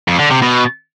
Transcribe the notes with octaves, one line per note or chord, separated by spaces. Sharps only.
F2
D3
C3
B2